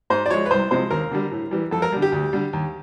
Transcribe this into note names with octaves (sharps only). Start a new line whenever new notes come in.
G#2 C5
D5
F3 G#3 C#5
B4
C2 C5
C3 F3 G#3 C5
D#2 A#4
D3 G3
A2
E3 G3
F2 A4
A#4
D3 G3
G4
D2
D3 G3
D#2